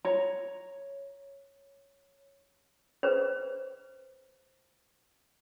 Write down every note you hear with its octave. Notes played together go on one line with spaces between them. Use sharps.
C#5 A#5
B4 C5